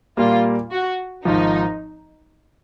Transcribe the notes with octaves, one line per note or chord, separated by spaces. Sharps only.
A#2 G3 A#3 F4
F#4
G#1 G#2 F3 D#4